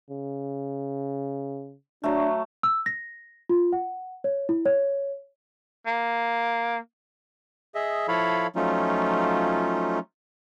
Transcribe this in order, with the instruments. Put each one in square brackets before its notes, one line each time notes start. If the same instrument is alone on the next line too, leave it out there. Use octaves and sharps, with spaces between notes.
[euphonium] C#3
[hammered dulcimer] F#3 A3 [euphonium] D4
[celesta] E6
A#6
F4
F#5
C#5
E4
C#5
[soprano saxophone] A#3
[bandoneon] G#4 D#5 E5
F3 E4 A4 C#5 F5 B5
F3 F#3 A3 C#4 D#4 F4